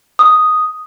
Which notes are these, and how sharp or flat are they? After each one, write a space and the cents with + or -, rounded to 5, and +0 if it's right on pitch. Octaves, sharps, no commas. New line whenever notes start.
D#6 +0